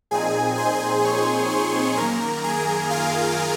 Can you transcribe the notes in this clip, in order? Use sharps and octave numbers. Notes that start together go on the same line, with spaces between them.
A#2 F3 C4 D#4 G#4 G#5
C5 C6
C#5 C#6
C5 C6
F#2 D#3 A#3 A#4 A#5
G#4 G#5
F4 F5